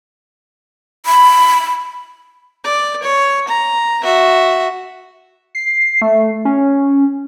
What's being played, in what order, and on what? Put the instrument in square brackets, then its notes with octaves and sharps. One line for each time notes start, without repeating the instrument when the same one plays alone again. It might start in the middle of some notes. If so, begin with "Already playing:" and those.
[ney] B5
[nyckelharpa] D5
C#5
A#5
F#4 E5
[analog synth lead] C7
A3
C#4